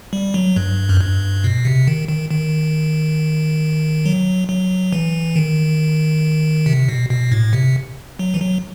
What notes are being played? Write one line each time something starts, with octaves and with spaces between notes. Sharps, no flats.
G3
F#3
G2
F#2
G2
B2
C3
D#3
D#3
D#3
F#3
F#3
E3
D#3
C3
B2
B2
A2
C3
F#3
E3
F#3